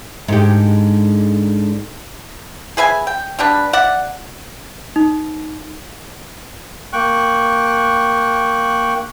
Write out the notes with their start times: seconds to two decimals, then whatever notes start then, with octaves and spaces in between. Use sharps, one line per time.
0.28 G#2 D3 G4
2.77 G#4 B4 E5 G#5
3.07 G5
3.39 B2 G3 D4 B4
3.73 D5 E5 F#5
4.96 D#4
6.93 A#3 G5 C#6 F#6